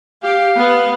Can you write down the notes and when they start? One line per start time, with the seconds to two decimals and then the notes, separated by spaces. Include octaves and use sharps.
0.23 G4 F5
0.56 B3